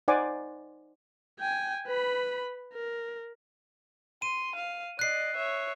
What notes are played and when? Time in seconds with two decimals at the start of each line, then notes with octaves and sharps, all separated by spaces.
0.08 D#4 C5 D5 F#5 G#5 D6
1.40 G5 G#5
1.87 B4 B5
2.73 A#4
4.22 C6 D#7
4.56 F5
4.99 D5 D#5 F#6 C7
5.37 C#5 E5